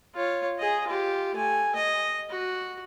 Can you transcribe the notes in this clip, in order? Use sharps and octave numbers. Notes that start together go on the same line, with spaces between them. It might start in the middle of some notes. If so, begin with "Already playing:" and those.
F4 C#5
G#4 D#5
F4 G4
A3 G#5
D#5
F#4